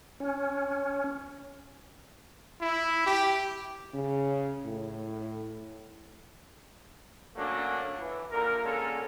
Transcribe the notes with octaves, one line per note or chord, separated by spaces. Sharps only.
C#4
E4
G4
C#3
A2
F#3 A3 A#3 C#4 D4
E3
A#2 D3 A#4
D3 G#3 A#3 C#4 A4